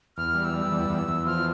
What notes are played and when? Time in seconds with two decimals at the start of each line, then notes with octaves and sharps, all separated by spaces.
0.17 E2 F6
0.35 G3
0.44 E6
0.54 G3
0.71 E2
0.90 E2
1.08 E2
1.26 F3 F6